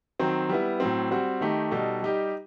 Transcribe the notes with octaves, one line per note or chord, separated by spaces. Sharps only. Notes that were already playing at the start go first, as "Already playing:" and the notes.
D#3 F#3 C4
G3 B3 E4
A2 F#3 C4
G3 C4 F#4
D#3 A3 D#4 G4
B2 G3 D#4 A4
G3 D#4 G4